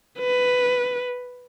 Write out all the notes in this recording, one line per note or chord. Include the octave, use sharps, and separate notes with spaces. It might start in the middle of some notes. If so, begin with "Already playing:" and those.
B4